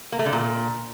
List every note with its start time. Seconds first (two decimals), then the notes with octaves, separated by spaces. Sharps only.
0.12 A#3
0.19 A3
0.26 D3
0.33 A#2